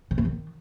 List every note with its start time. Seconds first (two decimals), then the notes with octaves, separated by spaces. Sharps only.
0.11 C#3
0.18 A3
0.25 D#3